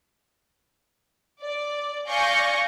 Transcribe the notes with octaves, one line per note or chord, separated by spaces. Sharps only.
D5
D5 F5 G#5 C#6 G6 A#6